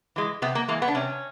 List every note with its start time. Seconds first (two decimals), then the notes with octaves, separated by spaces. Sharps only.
0.16 E3 G#3
0.42 C3 B3
0.55 A#3
0.68 E3 G#3 A#3
0.82 B3
0.88 D4
0.95 C3 C#4